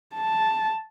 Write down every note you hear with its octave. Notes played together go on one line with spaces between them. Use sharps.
A5